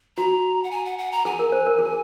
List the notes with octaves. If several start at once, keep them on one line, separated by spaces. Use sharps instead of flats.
F#4 A#5
F#5
G#5
F#5
F#5
A#5
G#4 G#5
A#4
C5
A#4
G#4